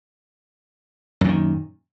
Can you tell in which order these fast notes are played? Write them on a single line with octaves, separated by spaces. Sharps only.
F#2 A#2 D#3